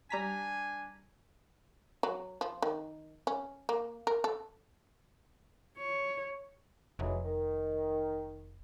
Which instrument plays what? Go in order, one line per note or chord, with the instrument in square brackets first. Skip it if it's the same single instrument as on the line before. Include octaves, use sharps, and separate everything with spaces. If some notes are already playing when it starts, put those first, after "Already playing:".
[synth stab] G3 A#5 B6 [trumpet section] D4 G#5
[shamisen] F#3
F3
D#3
C#4
A#3
A#4
A4
[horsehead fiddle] C#5
[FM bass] F1 [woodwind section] E3 F#3 G#3
[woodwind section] D#3